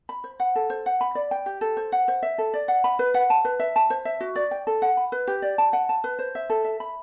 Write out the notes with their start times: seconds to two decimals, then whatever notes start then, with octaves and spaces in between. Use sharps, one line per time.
0.09 B5
0.24 C5
0.40 F#5
0.56 A4
0.70 C5
0.86 F#5
1.01 B5
1.15 D5
1.31 G5
1.46 G4
1.61 A4
1.77 C5
1.92 F#5
2.08 C5
2.23 E5
2.38 A4
2.54 D5
2.68 F#5
2.84 B5
2.99 B4
3.14 F#5
3.30 A5
3.45 B4
3.60 E5
3.76 A5
3.90 C5
4.05 E5
4.21 F#4
4.36 D5
4.51 G5
4.67 A4
4.82 F#5
4.97 B5
5.12 B4
5.27 G4
5.42 D5
5.58 A5
5.73 F#5
5.89 A5
6.04 B4
6.19 C5
6.35 E5
6.50 A4
6.64 E5
6.80 B5